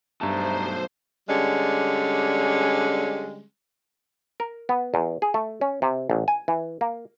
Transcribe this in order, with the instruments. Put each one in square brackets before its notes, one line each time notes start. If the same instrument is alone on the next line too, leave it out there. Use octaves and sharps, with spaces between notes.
[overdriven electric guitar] B1 A3 [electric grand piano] G2 A5 [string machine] C5 [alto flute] A#5
[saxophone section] D3 G3 G#3 C#4
[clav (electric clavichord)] A#4
B3
E2
G#4
A3
C#4
C3
A1
G#5
E3
A#3